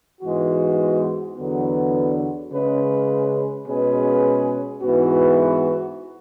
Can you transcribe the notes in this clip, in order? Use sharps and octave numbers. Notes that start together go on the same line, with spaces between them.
G#2 E3 G#3 B3 F#4
E2 D3 F#3 B3
C#3 G#3 C#4 G#4 B4
B2 G#3 C#4 G#4 B4
G#2 E3 B3 F#4